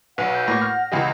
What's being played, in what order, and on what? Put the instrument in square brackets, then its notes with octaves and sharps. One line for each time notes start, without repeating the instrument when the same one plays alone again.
[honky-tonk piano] B1 [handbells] B4 [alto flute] F#5
[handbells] G6
[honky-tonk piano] A2 A#3 [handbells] A#6
[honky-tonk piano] F6
[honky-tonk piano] C#2 E3 G4 [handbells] D#5